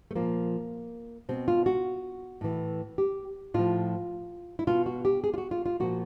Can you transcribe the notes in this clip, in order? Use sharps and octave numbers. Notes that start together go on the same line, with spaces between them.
A3
A#2 F3 A#3
B2 C4
F4
F#4
A2 E3
G4
A2 F3 F4
E4
B2 F4
F#4
G4
G#4
F4
F#4
F4
F4
A#2 F3 F#4